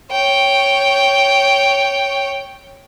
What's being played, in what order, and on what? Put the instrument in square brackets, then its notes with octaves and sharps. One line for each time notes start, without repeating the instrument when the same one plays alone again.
[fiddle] C#5 G5